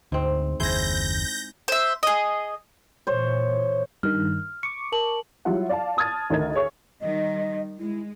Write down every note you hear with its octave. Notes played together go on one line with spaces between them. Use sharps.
D2 G#2 C4
F#1 D#2 E4 G#4 C5 G6 A#6
C5 E5
G#4 D#5
A#2 E3 C5 C#5
G2 D#3 F6
C#6 D6 C#7
A#4 A5 F#7
F#3 G3 E4 F4 E5 F#5
D5 F5 A5
A5 D#6 F6 G#6 A6
D2 D#3 D#4 A#4 G#6
G#4 C#5 E5 C#6
D#3 G3 D#5
G#3 E4